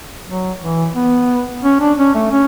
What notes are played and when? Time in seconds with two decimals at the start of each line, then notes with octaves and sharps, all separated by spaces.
0.28 F#3
0.61 E3
0.95 B3
1.64 C#4
1.80 D4
1.98 C#4
2.15 A3
2.31 C#4